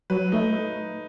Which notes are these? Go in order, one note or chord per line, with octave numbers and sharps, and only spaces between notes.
F#3 B4
A3 D#4